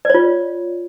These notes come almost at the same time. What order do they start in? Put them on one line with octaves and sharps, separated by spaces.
D5 C#5 F4